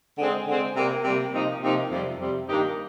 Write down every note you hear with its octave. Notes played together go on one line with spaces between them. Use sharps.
D3 G#3 C4
D3 G#3 C4
C3 G3 A#3
C3 G3 A#3
C3 F3 A#3 D#4
C3 F3 A#3 D#4
F2 C3 G3
F2 C3 G3
G2 D#3 A#3 D#4 G4